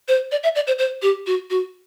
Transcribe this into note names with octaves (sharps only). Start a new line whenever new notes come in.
C5
D5
E5
D5
C5
C5
G4
F#4
F#4